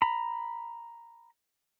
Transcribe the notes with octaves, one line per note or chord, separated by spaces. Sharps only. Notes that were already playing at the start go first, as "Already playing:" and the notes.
A#5 B5